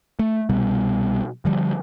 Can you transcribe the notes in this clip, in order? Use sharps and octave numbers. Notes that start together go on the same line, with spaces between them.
A3
C2 B2 G3 B3
D3 F3 G3